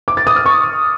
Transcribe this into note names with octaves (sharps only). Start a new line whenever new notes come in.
D6
A6
D#6
F6
C#6